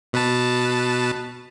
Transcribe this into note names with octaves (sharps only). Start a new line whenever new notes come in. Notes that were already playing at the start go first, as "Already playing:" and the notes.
B2 B4 A5